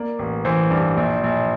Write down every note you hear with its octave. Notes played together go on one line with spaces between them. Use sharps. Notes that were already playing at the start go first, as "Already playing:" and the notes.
Already playing: A#3 D5
A1
E3 C5
G2
A#1
A#1